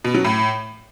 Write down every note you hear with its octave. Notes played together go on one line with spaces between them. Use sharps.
B2
F#3
A2